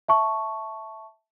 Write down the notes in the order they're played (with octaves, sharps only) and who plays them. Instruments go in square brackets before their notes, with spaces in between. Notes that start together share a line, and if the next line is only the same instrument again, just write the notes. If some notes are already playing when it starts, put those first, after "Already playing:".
[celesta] E5 A5 C#6